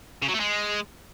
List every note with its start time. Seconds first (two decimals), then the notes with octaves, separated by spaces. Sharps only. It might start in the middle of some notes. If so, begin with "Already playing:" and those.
0.22 C#3
0.28 F#3
0.34 A3
0.40 G#3